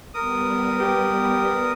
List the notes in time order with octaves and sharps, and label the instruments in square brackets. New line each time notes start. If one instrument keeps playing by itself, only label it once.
[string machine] G3 B3 [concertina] A#4 D#6
[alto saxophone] G4